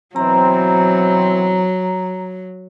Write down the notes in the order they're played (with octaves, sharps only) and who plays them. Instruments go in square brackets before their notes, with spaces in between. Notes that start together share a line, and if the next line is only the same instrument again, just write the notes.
[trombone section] B2 E3 C4 [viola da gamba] F#3 [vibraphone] A#5